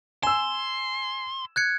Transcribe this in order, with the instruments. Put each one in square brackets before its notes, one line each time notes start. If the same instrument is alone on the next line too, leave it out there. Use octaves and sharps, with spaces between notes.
[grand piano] G#5 E6 [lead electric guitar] C6 [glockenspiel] E7
[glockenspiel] F#6 G#6 C#7